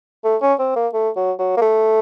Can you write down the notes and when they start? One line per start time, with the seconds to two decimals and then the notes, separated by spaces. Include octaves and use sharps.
0.24 A3
0.42 C#4
0.59 C4
0.76 A#3
0.93 A3
1.16 F#3
1.39 F#3
1.57 A#3
1.62 A3